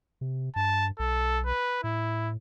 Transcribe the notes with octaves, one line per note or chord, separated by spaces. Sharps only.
C3
G2 A5
B1 A4
B4
A2 E4